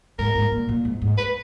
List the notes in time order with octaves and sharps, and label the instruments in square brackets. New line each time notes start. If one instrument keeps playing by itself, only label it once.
[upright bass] G#2 [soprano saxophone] A#4
[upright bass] G#2
A#2
A#2
G#2
G#2
[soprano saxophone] B4